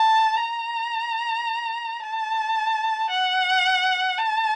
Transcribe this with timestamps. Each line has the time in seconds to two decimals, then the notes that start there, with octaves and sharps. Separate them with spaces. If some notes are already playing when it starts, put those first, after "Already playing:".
Already playing: A5
0.37 A#5
2.00 A5
3.10 F#5
4.19 A5